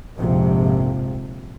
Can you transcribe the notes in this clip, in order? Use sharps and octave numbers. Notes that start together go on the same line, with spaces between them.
A#1 F2 G#2 C3 F3